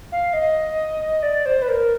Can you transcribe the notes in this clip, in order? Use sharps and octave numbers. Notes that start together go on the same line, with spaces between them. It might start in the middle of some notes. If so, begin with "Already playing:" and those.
F5
D#5
D5
C5
B4
A#4